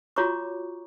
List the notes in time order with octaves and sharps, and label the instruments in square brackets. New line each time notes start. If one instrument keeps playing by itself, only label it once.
[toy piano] F4 F#4 C#5 A#5 C#6 D6